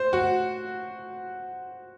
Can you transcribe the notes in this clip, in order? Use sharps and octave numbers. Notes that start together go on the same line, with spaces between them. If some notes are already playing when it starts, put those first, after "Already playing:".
Already playing: C5
F#4